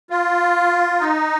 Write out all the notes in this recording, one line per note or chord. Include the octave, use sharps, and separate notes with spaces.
F4
D#4